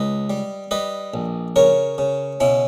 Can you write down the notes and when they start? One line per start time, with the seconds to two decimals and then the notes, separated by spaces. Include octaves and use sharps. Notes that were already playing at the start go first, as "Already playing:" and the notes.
Already playing: C#2 B4 D#5
0.30 G3
0.71 G3 B4 D#5
1.14 A#1
1.56 C#3 A#4 C#5
1.98 C#3
2.40 B2 C#4 E4